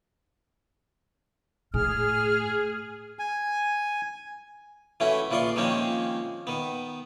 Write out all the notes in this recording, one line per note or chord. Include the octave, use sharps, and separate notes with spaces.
A2 G#4 F6
G#5
E3 A3 C#4 E4 F#4
A#1 E3 F4 D5 C6 C#6
D#3 F3 G#3 A#3 C4 C#4
D#3 B3